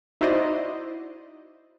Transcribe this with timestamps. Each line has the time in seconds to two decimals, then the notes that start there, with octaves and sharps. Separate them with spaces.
0.21 D#4 E4 F#4 C5 D5 D#5